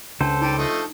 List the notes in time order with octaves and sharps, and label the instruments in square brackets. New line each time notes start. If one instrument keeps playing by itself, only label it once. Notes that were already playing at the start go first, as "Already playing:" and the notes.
[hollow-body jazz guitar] C#2 [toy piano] D4 A5 [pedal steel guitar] A4 C5
[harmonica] G3 [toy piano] D#4
[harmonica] F3 A3 D#5